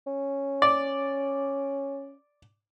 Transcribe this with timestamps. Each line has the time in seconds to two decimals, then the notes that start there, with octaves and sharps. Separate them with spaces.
0.07 C#4
0.62 D5